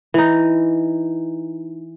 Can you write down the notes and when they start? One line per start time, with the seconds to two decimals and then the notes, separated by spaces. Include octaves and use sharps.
0.14 E3 D#4